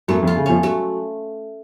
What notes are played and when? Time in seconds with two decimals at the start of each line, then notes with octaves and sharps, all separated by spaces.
0.08 F#2 F#3 A3
0.22 F2 F3
0.27 F4
0.36 C#3
0.46 F2 F3 C#4
0.63 F#3 A3